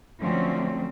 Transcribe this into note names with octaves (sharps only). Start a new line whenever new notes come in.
D3 F3 F#3 A3 C4 C#4